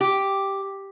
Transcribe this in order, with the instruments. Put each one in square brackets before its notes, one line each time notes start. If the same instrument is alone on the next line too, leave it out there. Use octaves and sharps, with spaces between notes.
[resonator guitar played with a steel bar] G4